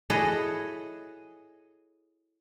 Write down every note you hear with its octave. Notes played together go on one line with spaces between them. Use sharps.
E4 F#4 G#4 A4 C#5 D#5